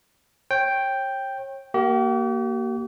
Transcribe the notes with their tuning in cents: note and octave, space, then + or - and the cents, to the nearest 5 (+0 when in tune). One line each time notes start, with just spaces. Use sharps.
C#5 -35 G5 +0
A#3 +0 G4 -45